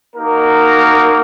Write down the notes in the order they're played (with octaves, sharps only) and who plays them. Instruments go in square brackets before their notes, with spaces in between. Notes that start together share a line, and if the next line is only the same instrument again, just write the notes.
[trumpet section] A#3 D#4 F#4 A#4